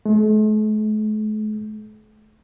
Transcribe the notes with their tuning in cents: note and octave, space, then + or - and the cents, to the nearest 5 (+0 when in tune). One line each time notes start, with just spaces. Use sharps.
A3 -45